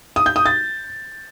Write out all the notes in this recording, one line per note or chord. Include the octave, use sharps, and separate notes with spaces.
D#6
G6
D#6
A6